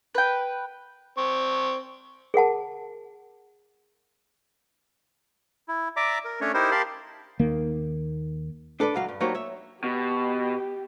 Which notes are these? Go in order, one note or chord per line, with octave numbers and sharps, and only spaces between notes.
B4 G5
C4 C#6
G#4 A#4 F#5 A5
E4
D5 E5 A#5 D6
A#4
A3 C#4 D4 C#5
D#4 E4 G4 A#4 C5
G4 A#4 F5 A5 B5 C6
D#2 D#3 A#3
D4 A4 B4 D5
C#2 F#3 F5
G2
F#3 G3 A#3 D#4 C5 C#5
C#5 E5
B2 G4